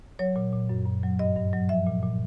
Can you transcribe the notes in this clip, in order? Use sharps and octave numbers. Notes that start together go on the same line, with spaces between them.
F#3 C#5
A#2
A#2
F#2
F#2
F#3
G2 D#5
G2
F#3
F3 E5
A#2
A#2